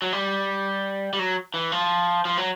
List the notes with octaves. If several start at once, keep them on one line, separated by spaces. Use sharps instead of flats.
F#3
G3
G3
F#3
E3
F3
F3
F#3